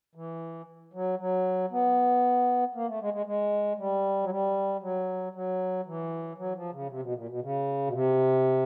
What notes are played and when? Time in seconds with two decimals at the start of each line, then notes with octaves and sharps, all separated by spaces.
0.15 E3
0.93 F#3
1.19 F#3
1.71 B3
2.75 A#3
2.88 A3
3.01 G#3
3.14 G#3
3.26 G#3
3.78 G3
4.23 F#3
4.31 G3
4.82 F#3
5.35 F#3
5.86 E3
6.38 F#3
6.55 F3
6.72 C#3
6.89 C3
7.02 B2
7.15 A#2
7.28 B2
7.42 C#3
7.87 B2
7.93 C3